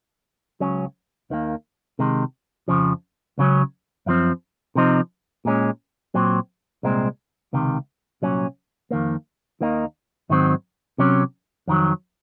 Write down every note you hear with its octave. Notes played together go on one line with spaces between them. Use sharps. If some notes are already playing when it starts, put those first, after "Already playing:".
C#2 C#3 F#3 C#4
D#2 D#3 A#3
C3 D#3 G#3
F2 C#3 F3
C#2 C#3 F#3 C#4
F#2 F3 C4
C3 F3 C4 D#4
A#2 G#3 C#4
A#2 F#3 C4
C2 A#2 G#3 C4
C#2 C3 D#3
C2 A#2 F#3 C#4
F2 D#3 A#3
D#2 D#3 A#3 D#4
G#2 D#3 F#3 C4
C3 F#3 C#4
F2 D#3 F#3